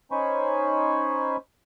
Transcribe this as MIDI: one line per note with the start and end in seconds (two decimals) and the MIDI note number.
0.12 1.37 61
0.12 1.37 63
0.12 1.37 72
0.12 1.37 80
0.12 1.37 83
0.12 1.37 85